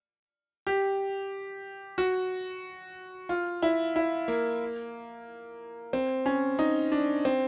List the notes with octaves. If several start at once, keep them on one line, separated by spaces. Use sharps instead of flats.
G4
F#4
F4
E4
E4
A#3
C4
C#4
D#4
D4
C4